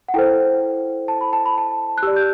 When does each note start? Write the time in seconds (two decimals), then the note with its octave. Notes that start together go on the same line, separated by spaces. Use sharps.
0.08 F#5
0.14 E4 A4 C5 G5
1.08 A5
1.21 B5
1.33 A5
1.46 B5
1.58 A5
1.98 F#6
2.03 G4 D5 E6
2.16 G6